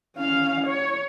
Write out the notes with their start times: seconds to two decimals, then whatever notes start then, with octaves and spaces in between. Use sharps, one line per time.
0.17 C#4 F5
0.66 C#5